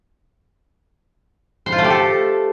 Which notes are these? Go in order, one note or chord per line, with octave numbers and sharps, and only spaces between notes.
C5
F4
A3
G4
A4